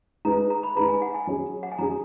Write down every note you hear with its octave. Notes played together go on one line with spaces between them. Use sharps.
G#3 D#4 G#4 B4 A#5
A#5
B5
G#3 D#4 G#4 B4 A#5
G#5
F#5
G#5
F#3 C#4 G#4
F#5
G#5
F#3 C#4 G#4 A#5